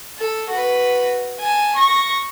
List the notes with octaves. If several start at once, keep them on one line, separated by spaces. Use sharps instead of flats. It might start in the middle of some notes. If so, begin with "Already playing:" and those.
A4
F#4 B4
G#5 A5
C#6 A#6